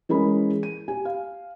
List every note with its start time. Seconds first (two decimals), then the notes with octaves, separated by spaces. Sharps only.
0.09 E3 G#3 C#4 G#4 A#4 B5
0.63 D#7
0.88 G4 G#5
1.05 F5